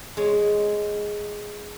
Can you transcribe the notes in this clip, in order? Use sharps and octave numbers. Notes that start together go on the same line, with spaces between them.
G#3 C#5